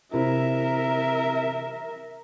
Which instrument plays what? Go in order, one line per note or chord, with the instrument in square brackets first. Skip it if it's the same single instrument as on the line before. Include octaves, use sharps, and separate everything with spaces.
[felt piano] C3 E4 [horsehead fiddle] A#4 E5